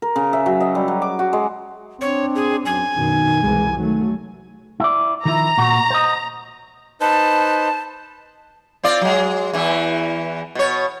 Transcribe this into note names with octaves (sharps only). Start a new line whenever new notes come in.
A#4
C#3
E5
F#3
D#5
G3
F#3
D6
F#4
G#3
C4 D4 C#5
G#4
F#2 G#5
F#2 B2 D#3
C2 E3 G#3
D#3 F#3 A3
E4 D5
D#3 F3 E4 A#5
A#2 F#4
C5 D#5
D#4 B4 C5 A5
C4 F4 D5
F#3 G#3
E2 E3
B2 C#5